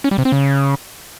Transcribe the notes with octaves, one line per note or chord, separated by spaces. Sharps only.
C#4
G3
C3
C4
C#3